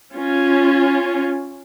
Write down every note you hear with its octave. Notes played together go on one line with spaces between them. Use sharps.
C#4 F4